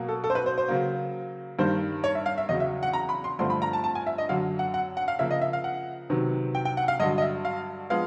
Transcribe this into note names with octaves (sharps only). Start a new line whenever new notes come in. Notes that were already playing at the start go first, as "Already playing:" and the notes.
Already playing: B2 F#3 A#3
A4
A4
C5
B4
C5
C5
C#3 F#3 A#3
G2 D#3 G3 A#3 C5
C#5
E5
F5
E5
E2 C#3 F#3 D#5
E5
F#5
A#5
B5
C6
G2 D3 F3 A3 C4 C6
B5
A#5
A5
A5
G#5
E5
D#5
F#2 D3 F#3 F5
F#5
F#5
F#5
F5
C#3 F3 A#3 E5
D#5
E5
F5
F#5
C3 D#3 F#3 B3
G5
G5
F#5
F5
G2 D3 F#3 D#5
D#5
E5
F5
F3 G#3 B3 F5